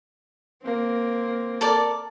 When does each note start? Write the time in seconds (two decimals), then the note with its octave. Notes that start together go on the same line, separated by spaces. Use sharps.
0.62 A#3 C4
1.61 A4 A#4 D5